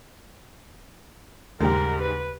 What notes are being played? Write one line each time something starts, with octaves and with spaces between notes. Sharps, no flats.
D#2 G#2 C#3 G3 G#3 G4 A#4
B4